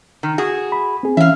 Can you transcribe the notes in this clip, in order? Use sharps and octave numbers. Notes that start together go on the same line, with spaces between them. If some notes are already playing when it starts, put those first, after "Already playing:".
D#3
F#4 G#4
B5
C4 G#4
E3 C#4 E5 F5